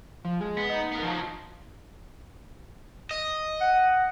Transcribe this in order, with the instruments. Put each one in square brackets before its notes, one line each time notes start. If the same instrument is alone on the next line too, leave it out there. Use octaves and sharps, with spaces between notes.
[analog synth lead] F3
G#3
[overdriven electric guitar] B3
[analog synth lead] D#4
[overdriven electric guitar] B3 A#4
F3 F#3
D#5
[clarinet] F#5